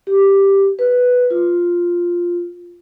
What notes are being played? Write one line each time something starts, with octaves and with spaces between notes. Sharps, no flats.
G4
B4
F4